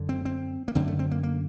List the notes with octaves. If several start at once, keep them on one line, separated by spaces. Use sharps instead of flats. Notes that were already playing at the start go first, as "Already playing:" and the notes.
Already playing: F#2 D3
C4
C4
A#3
F#2 D3 C4
A3
C4
A#3
A#3